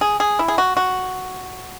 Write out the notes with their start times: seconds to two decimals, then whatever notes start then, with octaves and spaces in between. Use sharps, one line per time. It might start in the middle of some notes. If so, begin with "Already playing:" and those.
0.01 G#4
0.20 G#4
0.39 E4
0.48 G#4
0.58 F#4
0.77 F#4